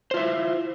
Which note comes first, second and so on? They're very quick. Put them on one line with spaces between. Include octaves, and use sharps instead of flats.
C5 F4 E5 E4